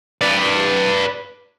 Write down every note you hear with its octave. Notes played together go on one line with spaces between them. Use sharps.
B4 D5